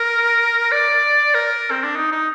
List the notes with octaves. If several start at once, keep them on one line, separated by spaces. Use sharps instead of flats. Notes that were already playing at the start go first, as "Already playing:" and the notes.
Already playing: A#4
D5
A#4
C4
D4
D#4
D#4